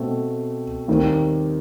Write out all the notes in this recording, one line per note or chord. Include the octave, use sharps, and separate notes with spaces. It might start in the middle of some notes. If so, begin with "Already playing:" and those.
Already playing: B2 A3 C4
D#2 D#3 G3 C4